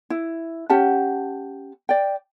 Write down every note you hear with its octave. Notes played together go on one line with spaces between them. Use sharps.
E4
C#4 G4 F#5 A5
D5 G5